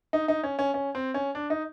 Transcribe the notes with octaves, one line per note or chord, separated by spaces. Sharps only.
D#4
D#4
C#4
C#4
C#4
C4
C#4
D4
D#4